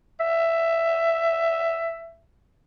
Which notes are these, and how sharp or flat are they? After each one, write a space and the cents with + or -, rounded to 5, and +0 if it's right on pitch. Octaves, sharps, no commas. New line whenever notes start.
E5 +10